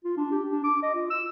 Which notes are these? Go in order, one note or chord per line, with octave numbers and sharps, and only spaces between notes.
F4
D4
G4
D4
D6
D#5
F4
E6